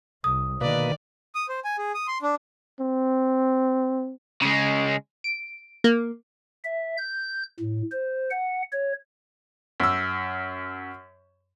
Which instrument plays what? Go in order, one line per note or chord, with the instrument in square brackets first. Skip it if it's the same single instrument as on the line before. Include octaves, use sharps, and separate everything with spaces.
[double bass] C2 [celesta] D#6
[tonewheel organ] B2 A#3 B4 [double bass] D3 D#3 [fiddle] D5
[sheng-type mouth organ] D#6
C5
G#5
G#4
D#6
C6
D4
[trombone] C4
[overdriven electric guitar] C#3 G#3
[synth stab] D7
A#3
[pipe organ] E5
G6
A2
C5
F#5
C#5
[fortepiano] F#2 E6